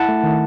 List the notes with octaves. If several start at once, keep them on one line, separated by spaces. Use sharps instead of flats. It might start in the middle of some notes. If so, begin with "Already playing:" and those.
Already playing: E4 F#5 A5
A3
D#3